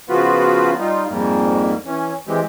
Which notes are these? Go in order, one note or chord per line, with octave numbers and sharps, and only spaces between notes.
C#3 F3 B3 F4 F#4 B4
G3 D#4 F4
F2 G#2 G3 A#3
E3 C#4
E3 G#3 C4 G4